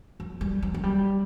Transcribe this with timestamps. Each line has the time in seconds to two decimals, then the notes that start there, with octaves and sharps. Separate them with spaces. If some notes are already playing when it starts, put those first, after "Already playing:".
0.20 F#3
0.41 G3
0.62 F#3
0.74 F#3
0.83 G3